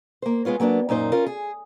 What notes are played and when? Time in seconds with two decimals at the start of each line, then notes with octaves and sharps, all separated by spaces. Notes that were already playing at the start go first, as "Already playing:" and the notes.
0.22 A#3 C5
0.45 G#3 B3 F4 C#5
0.60 F#3 A#3 B3 D4
0.89 F#2 A#2 D#4 C5
1.12 C#4 F4 A#4
1.26 G#4